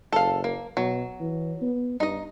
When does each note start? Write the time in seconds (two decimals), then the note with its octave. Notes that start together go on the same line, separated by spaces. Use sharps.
0.13 F#1 A4 F5
0.44 A#3
0.77 B2 F#3
1.20 E3
1.62 B3
2.00 G2 D#4 D#5